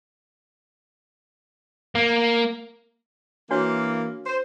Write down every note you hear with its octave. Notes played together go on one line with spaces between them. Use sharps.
A#3
E3 A#3 D4 F#4 C#5
C5